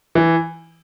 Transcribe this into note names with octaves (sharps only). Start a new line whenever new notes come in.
E3